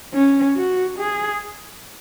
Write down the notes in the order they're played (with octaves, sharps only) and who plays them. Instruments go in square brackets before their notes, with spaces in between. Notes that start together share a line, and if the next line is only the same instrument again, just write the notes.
[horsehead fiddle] C#4
F#4
G#4